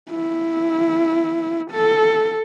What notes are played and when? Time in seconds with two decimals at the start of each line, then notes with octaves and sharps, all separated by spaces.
0.10 E4
1.71 A4